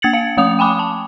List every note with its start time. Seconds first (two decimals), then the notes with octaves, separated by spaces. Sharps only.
0.02 A#3 G#6 A6 C#7 F#7
0.13 F5 C#7
0.37 F3 A3 D#6 F7
0.59 G5 G#5 B5 D6
0.79 A5